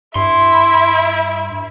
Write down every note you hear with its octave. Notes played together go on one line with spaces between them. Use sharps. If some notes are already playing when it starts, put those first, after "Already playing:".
G2 E4 C6